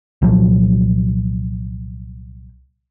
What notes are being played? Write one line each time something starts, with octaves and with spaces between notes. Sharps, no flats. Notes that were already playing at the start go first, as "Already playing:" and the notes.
C2 A#2 F3 F#3